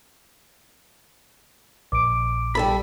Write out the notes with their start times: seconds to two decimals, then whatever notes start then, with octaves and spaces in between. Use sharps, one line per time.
1.92 A#1 D6 D7
2.55 G3 A4 B5